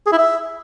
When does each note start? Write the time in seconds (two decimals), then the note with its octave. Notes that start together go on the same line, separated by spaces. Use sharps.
0.06 G#4
0.12 E4
0.18 E5